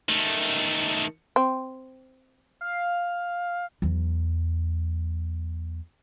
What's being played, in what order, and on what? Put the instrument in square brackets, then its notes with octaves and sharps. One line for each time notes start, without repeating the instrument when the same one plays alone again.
[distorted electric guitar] D#3 A3
[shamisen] C4
[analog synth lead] F5
[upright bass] E2 F#3